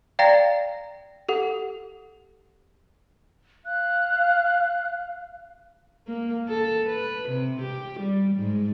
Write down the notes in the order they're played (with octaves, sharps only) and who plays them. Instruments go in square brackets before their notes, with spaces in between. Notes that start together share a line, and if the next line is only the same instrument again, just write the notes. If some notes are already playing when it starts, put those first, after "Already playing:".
[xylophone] D5 F5 G5 A#5 A6 A#6
G4 A4 F#5
[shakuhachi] F5 [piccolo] F#6
[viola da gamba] A#3
A4
B4
C3
G4
G3
G#2